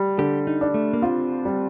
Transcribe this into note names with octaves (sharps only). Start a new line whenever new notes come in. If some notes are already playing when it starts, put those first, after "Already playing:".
Already playing: G3
D3 G4
D#4
D4
A3
A#3
C4 F4
G3